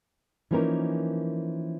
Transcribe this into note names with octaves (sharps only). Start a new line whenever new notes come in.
E3 F3 A#3 C#4 D#4 A#4